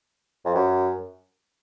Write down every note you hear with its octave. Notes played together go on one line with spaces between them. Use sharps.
F2
F#2